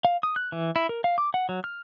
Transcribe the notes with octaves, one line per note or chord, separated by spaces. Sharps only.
F5
D#6
F#6
E3
E4
A#4
F5
D6
F#5
F#3
F6